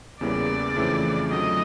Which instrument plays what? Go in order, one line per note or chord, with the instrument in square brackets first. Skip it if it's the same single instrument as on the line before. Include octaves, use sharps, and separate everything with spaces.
[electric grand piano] E2 C#3 E3 G3 A#3 [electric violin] D5
[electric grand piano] F2 C#3 E3 A3 C4
[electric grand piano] F2 D3 F#3 A3 [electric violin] D#5